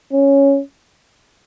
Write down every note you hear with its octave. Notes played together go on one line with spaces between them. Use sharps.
C#4